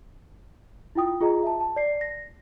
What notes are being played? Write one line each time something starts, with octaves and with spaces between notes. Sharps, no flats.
E4 F4 G5 D#6
F4 G#4 D#5 A#5
E5 A5
A5
D5 C7
A#6